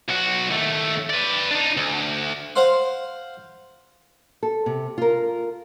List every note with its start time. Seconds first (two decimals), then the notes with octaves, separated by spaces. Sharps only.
0.09 B1 F#4
0.51 D#2 A3
1.10 B4 D5
1.51 D4 D#4
1.77 D2
2.56 C5 F5 F#5 C6
4.43 A4
4.66 C3
4.98 F4 A#4